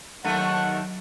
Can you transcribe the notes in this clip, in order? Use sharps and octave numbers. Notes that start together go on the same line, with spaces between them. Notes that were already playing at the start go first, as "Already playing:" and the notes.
D#2 D#3 F#3 A3 F#5